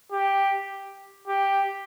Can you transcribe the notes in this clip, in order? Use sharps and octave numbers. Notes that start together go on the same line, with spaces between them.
G4
G4